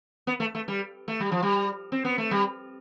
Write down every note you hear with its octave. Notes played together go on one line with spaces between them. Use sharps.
B3
A3
A3
G3
A3
G3
F3
G3
C4
B3
A3
G3